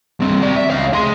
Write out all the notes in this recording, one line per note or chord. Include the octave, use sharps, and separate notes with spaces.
G2 C4
C4 D5
E5
C#2 F5
G#4 C6